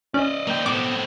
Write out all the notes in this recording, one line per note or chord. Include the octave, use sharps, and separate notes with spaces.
C#4 D5 D#5
A#3 G5
A2 B3 C4 D6